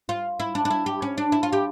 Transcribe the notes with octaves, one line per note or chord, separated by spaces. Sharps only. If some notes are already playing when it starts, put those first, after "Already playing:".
F4
E4
D4
D4
E4
G4
C#4
D4
E4
F4
G4